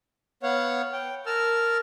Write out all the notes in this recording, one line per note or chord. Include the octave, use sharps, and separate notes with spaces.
B3 C#5 F5 F#5
G5
A#4 A5 E6 F6